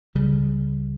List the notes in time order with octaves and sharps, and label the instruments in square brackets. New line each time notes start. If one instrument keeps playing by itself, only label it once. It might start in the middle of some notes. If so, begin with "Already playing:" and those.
[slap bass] C#2 C#3 G3